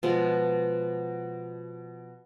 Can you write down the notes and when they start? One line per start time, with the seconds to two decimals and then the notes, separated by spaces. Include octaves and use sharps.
0.03 B2 F3 G#3